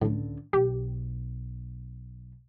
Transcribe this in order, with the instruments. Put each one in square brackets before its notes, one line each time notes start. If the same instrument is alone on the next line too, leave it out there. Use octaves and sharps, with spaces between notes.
[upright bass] C#2 D3 [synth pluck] A2
[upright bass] B1 [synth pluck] G4